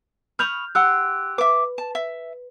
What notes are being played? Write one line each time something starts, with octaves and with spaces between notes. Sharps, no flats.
B5 C#6 D#6 F6 G6 F7
G4 F#5 C6 E6 F#6
B4 E5 D6
A5
E5